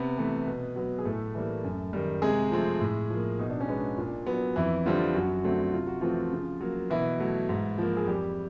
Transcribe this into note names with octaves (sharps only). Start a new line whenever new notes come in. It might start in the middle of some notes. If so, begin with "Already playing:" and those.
Already playing: C3 B3 B4
E3 A3
B2
F#3 B3
G#4
A2 A3 A4
E3 G3 A#3
F#2
D#3 G3
C3 G#3 G#4
F3 A3 C4
A2
F3 A#3
B2 D#4
D4
C#4
G#3 B3 D4
A#2
F#3 B3
F2 E3 E4
D3 F3 G3 C4 F4
F#2 F#3 F#4
D3 F#3 A3 C4
C3 F4
F#4
E3 F3 A3 C4 F4
C#3
F#3 A#3
B2 E3 E4
F#3 A3
G#2
F3 A#3
G#4
F2 G3 G4